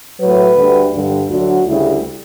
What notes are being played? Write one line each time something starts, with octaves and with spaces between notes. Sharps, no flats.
A2 F#3 B4
D2 D3 G3
G2 D3 G3
D2 D3 F#3 F#4
D2 C#3 G3 E4